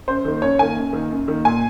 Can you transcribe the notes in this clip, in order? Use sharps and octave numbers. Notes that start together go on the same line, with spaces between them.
F#2 C5
D#3 A#3
F#2 C#5
D#3 A#3 G#5
F#2
D#3 A#3
F#2
D#3 A#3
A#2 G#5